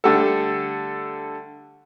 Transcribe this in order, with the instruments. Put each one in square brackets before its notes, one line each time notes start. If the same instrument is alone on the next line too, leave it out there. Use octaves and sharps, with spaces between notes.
[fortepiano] D3 G3 A3 A4